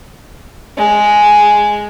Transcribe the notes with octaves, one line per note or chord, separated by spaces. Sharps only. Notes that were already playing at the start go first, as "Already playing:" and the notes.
G#3